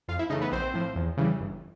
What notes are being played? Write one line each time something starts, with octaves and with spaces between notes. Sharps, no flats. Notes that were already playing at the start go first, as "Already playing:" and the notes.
F2 F4 F5
E4 E5
C#3 E3 A3 D#4 D#5
B3 B4
A#1 C4 C5
A2 F3
E2
C#3 E3 G3
G1